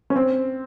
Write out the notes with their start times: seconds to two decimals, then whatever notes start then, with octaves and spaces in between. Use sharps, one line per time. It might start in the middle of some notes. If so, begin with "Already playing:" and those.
0.10 C#4
0.16 C4